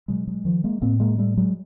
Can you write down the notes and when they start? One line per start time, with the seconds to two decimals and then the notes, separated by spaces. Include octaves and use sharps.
0.08 B2 F#3 G#3
0.27 F#3 G#3
0.45 D#3 F3
0.64 G#3 A#3
0.82 A2 A#3 C4
1.00 G#3 A#3
1.18 G3 A3
1.37 F#3 G#3